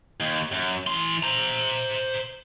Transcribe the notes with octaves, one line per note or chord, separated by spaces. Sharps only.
D#2
F#2
E3 C6
C5 A#5